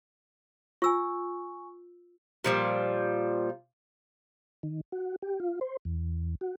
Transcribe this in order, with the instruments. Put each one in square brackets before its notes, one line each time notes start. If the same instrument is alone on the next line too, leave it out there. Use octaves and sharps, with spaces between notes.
[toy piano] F4 E6 [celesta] G#5 C#6
[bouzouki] A#2 F3 G3
[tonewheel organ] D#3
F#4
G4
F4
C5
E2
F#4